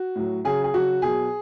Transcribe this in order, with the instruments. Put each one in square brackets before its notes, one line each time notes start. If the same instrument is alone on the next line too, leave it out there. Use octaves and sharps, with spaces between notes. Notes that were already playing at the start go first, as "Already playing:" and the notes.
Already playing: [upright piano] F#4
A2 F#3
C#3 F#3 G#4
G#4
C#3 F#3 F#4
B2 F#3 G#4